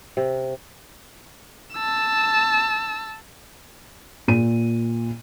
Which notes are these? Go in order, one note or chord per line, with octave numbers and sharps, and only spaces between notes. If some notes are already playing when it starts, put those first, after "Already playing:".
C3
A5 E6
A#2 D#7